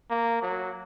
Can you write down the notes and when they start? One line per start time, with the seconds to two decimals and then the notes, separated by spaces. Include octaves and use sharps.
0.10 A#3
0.42 F#3